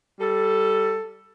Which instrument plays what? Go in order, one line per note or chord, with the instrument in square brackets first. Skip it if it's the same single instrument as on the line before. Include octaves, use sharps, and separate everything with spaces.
[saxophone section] G3 A4